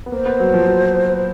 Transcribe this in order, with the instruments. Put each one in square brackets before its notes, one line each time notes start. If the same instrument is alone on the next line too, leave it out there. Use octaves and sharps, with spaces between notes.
[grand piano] B3
[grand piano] A#3 [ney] C5
[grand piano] B3
F#3
F3
F#3